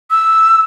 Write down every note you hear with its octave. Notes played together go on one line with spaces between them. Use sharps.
E6